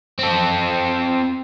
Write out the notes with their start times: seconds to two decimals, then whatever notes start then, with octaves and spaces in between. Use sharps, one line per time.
0.19 C4 A4